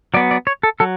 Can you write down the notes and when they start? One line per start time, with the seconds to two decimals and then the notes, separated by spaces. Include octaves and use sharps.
0.14 F#3 B3 D5
0.31 D5
0.47 C#5
0.63 A4
0.80 F#3 A4